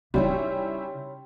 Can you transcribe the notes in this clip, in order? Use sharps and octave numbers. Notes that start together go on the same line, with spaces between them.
C#3 G3 C#4 D#4 E4 C#5 G5 C6